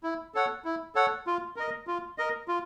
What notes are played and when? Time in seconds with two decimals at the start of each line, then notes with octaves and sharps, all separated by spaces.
0.03 E4
0.34 A4 C#5 F#5
0.65 E4
0.95 A4 C#5 F#5
1.27 F4
1.56 A#4 D#5
1.87 F4
2.18 A#4 D#5
2.48 F4